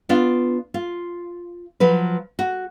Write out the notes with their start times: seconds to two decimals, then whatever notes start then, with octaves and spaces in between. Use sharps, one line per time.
0.09 B3 D4 F4
0.74 F4
1.80 F3 F#3 B4
2.39 F#4